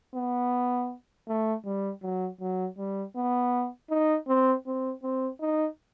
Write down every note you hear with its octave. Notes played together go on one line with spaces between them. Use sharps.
B3
A3
G3
F#3
F#3
G3
B3
D#4
C4
C4
C4
D#4